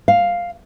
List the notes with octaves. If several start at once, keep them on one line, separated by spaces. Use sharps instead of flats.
F5